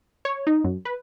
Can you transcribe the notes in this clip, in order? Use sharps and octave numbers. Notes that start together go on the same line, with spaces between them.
C#5
D#4
F#2
B4